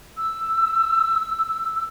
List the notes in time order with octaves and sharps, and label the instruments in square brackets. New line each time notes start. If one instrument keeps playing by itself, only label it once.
[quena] E6